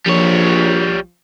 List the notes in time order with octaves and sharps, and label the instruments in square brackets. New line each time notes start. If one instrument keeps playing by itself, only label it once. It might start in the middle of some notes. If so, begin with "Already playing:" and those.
[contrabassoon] A#1 [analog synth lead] F3 [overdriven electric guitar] G3 C#5